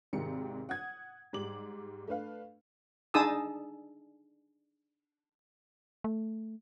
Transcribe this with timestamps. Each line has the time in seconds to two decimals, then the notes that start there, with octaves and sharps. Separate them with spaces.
0.13 G#1 G#2 C3 D#3 C#7
0.69 F#5 D#6 G#6
1.33 G#2 G3 D6 F#7
2.08 A3 D4 B4 F5
3.14 D4 D#4 G#4 A5 D#6 E6
6.04 A3